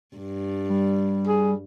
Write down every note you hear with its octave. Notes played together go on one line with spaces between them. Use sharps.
G2
G3
G#4